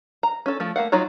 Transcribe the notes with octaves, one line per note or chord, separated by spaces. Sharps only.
A#5
C#4 A4
F3 A3
A3 A#3 F5 F#5
F#3 D#4 F4 C#5 A#5